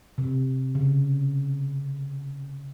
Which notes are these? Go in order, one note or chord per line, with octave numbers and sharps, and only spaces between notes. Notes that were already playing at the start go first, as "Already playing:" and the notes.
C3
C#3